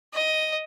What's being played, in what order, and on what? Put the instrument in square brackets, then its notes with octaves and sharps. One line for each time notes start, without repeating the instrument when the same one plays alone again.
[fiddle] D#5